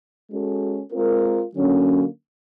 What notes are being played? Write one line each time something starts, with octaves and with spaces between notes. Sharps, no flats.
G#3 C#4 F#4 A4
G#3 C4 F4 A#4
D3 F#3 A#3 C#4